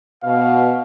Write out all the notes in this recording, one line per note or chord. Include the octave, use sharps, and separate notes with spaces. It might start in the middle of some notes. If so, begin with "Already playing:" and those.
B2 F5